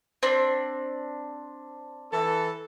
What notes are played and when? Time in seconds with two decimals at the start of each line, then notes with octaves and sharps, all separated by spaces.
0.23 C4 D4
2.12 E3 A4